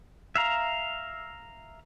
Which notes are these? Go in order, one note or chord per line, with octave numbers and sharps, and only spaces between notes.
E5 F5 A#5